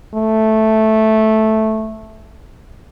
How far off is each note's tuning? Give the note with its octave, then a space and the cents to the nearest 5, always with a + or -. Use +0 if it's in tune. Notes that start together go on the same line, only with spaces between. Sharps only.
A3 -5